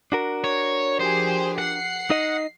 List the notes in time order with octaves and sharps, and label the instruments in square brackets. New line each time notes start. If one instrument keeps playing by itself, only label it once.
[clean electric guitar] D4 F#4 A#4
[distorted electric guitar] C#5
[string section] F3 G4 G#4 [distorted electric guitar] C5
[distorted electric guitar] F#5 [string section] C7
[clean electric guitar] D#4 D#5